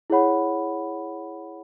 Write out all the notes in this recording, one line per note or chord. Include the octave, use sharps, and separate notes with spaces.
E4 G#4 C#5 F#5 B5